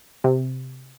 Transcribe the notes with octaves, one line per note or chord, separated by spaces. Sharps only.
C3